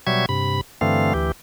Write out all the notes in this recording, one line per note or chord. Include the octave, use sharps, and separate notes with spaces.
B2 F#3 G3 E5 C#6 G#6
G2 C3 B5
G2 D3 E3 A3 C4 F5
D2 E3 G4